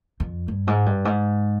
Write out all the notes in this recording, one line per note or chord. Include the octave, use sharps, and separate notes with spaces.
F2
G2
G#2
G2
G#2